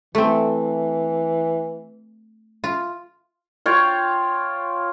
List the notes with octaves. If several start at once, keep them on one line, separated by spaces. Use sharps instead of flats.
E3 A3 C4
F4
F4 C#5 G5